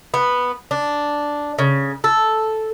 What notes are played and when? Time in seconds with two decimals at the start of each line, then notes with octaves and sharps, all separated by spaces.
0.14 B3
0.71 D4
1.59 C#3
2.04 A4